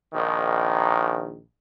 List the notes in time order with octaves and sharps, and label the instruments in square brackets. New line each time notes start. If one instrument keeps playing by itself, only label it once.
[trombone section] A#1 D#3